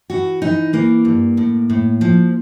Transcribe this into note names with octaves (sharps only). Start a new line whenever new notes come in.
E3 F#4
E3 D#4
E3 A#3
G2
A2
A2
F3